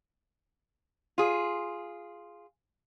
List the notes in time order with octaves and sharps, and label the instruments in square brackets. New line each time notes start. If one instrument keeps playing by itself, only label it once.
[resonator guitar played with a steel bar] F4 G#4